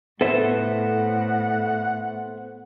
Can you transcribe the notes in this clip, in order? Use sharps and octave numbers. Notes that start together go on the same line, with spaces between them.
A2 B3 A4 C5 E5 F#5